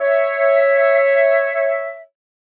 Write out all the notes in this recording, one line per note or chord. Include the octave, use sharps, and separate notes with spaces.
C#5 E5